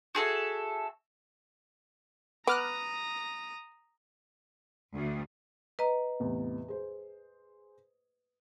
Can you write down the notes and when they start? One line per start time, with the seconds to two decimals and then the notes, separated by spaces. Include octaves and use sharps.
0.15 F#4 G#4 A4 E5
2.47 B3 A#5 D6 D#6 F6 F#6
4.94 D2
5.79 B4 D#5 A#5
6.20 E2 A2 C3
6.68 G#4 C5